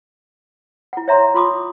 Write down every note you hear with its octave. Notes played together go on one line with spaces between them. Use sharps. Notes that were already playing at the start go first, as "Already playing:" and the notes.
E4 F#5
C#5 E5 A#5 C6
F4 C6 D6 D#6